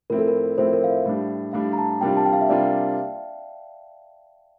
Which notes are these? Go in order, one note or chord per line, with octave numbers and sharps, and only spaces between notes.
A2 F3 C4 E4 A#4
A4
A#4
A2 F3 C4 E4 C5
A#4
F5
E5
A2 G3 D4
A2 G3 D4 F5
A#5
A5
C3 G3 A#3 D4 F4 G5
A5
G5
F5
E5
C3 G3 A#3 D4 F4 D5